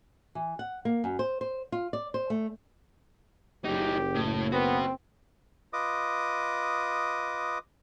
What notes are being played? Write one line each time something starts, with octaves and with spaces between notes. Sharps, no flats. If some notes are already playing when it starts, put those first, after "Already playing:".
E3
F#5
A#3
F#2
C5
C5
F4
D5
C5
A3
F#1 F#2 D#4 G4
A2
B3 C4 F#4 B4
F4 B4 D#5 D6 D#6